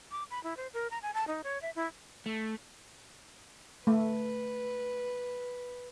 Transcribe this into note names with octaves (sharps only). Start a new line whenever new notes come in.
D6
B5
E4
C5
A#4
A#5
G#5
A5
D#4
C#5
E5
E4
A3
A3 B4